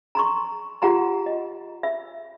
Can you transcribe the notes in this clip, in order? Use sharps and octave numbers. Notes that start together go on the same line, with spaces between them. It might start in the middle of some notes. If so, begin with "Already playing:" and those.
A#5 C6 C#6
F4 G4 F#5 A#5 C6
D#5
E5